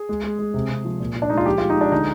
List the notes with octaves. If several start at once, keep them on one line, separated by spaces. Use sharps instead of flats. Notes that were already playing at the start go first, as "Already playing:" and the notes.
Already playing: G#4
G#3
G#3
G#3
C3
C3
F3
A#2
A#2
D4
G#3 D#4
F4
F3 G4
G#3 F4
D#4
G#3 D4
D3 D#4